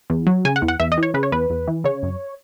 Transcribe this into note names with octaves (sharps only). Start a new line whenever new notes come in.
E2
F#3
C#3 G#5
F#5
E2
F#5
E2 E5
D#5
E3
C#5
C#3 B4
C#5
E2 B4
E2
E3
C#3 C#5
F#2